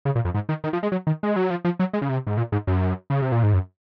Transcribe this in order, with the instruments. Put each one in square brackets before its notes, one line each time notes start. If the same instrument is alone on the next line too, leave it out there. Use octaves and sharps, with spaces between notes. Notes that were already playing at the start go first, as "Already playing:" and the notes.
[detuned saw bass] C#3
A#2
F2
G#2
D#3
D#3
F3
G#3
F#3
D#3
G#3
F#3
F3
F3
F#3
G#3
C#3
C3
G#2
A#2
G#2
F#2
C#3
C3
A#2
G#2
F#2